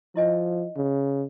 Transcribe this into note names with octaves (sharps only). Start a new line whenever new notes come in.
F3 E4 D#5 G#5
C#3